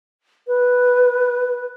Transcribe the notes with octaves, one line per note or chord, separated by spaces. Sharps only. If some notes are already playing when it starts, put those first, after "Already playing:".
B4